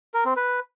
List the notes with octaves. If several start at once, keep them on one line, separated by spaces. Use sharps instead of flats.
A#4
C4
B4